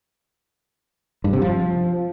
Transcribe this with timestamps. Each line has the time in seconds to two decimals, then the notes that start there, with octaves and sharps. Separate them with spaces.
1.24 G2
1.33 C3
1.42 F3